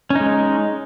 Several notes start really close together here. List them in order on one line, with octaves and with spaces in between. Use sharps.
C#4 D#4 G#3